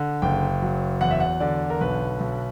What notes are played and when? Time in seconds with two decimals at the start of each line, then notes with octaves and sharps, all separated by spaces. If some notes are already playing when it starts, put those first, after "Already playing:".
Already playing: D3
0.22 F#1 G5
0.62 F#3
1.01 E2 F#5
1.11 E5
1.20 F#5
1.40 D3 D5
1.70 A#4
1.81 B1 B4
2.20 B1